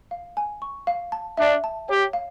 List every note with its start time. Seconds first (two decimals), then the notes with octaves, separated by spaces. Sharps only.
0.11 F5
0.37 G#5
0.62 C#6
0.87 F5
1.12 A5
1.37 D4 E5
1.64 A5
1.89 G4 C#5
2.13 F5